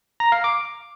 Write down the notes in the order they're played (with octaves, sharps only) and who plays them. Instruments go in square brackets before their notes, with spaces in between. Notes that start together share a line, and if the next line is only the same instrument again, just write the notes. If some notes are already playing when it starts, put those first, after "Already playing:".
[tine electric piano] A#5
F5
D6